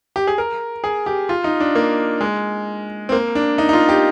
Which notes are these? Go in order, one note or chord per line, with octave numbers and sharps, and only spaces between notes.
G4
G#4
A#4
G#4
G4
F4
D#4
D4
A#3
G#3
C4
A#3
D4
D#4
D#4
F4
G4